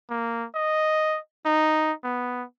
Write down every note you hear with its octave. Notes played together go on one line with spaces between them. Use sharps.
A#3
D#5
D#4
B3